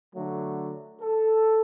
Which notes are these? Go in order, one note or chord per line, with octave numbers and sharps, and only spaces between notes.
D3 F#3 A3
A4